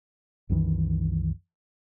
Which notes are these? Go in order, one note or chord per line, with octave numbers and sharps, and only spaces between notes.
C2 F#2 D#3 E3